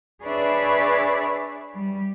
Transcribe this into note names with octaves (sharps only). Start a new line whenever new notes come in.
D4 G#4 B4 C#5 D5 E5
G3